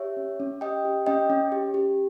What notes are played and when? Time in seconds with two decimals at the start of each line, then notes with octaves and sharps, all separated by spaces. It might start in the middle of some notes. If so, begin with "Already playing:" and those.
Already playing: G4 C#5 E5
0.17 C#4
0.40 C#4
0.61 G4 D#5 G5
0.85 G4
1.06 C#4 D#5 G5
1.30 C#4
1.52 G4
1.74 G4